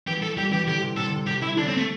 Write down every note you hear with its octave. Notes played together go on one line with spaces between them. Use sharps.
E3 G4
A4
G3 G4
E3 G4
D3 G4
C3
C3 A4
D3
C3
C3 G4
E4
D3 D4
C4
A3